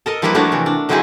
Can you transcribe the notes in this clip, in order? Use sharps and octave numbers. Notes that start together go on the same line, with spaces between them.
A4 A#4 D#5
F3 G3 A#3 E4 A#4 B4
F3 A3 D4 F#4 A#4 C#5
C3 E3
D4
D3 F#3 C4 D#4 E4 G#4